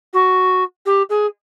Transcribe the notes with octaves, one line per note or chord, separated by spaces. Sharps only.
F#4
G4
G#4